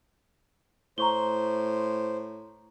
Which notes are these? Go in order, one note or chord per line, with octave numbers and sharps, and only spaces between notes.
A2 C5 A#5 C#6 G7